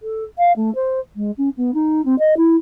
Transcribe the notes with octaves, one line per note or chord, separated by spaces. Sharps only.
A4
F5
A3
C5
G#3
C#4
B3
D#4
C4
D#5
E4